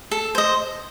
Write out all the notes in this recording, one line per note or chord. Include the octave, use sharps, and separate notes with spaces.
A4
C5 D#5